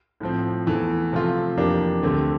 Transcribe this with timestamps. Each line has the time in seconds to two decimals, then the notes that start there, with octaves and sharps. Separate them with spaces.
0.20 A2 F3 C4
0.66 E2 E3 A3
1.12 C3 F3 A3 C4 F4
1.57 F2 E3 A#3 D4 G4
2.03 D2 D3 A3 C4 G4